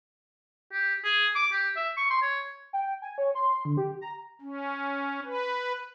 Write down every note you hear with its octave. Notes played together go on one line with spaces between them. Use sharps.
G4
G#4
D6
G4
E5
C#6
C6
C#5
G5
G#5
C#5
C6
D3
G4
A#5
C#4
B4